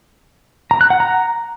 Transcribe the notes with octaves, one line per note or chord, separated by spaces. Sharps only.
A#5
F#6
F#5
A#5